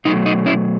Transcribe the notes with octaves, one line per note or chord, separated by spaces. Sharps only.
B2 F#3 A3 D#4
D#4
C#4 E4